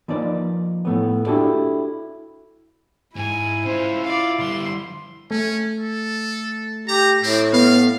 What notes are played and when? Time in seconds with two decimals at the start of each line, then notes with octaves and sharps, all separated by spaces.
0.08 F3 A#3 D#4 B4 D5
0.85 A2 A3 B3
1.26 D4 E4 F#4 G4 A4 D5
3.16 G#2 E4 G#5
3.66 C#4 F4 C5
4.04 F4 D5 F5
4.39 D3 G3 C6
5.31 A3 C#4
5.80 A4
6.88 G4 A#5
7.23 A2 C4
7.53 B3 F5